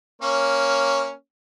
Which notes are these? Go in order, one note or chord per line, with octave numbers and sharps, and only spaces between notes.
A#3 C#4 C#5